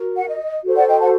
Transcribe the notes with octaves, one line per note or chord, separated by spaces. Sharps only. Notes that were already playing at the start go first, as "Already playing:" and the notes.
Already playing: F#4 A#4
F#5
D#5
F#4 A4 C5
D5 F#5
D#5 G5
F#5 A5